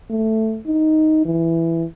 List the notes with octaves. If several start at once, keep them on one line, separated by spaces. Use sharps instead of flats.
A3
D#4
E3